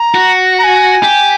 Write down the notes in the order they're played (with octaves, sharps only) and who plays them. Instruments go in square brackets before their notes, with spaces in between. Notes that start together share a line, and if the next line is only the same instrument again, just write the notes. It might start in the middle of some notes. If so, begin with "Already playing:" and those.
Already playing: [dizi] A#5
[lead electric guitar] F#4
[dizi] A#5
G#5
[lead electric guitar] G4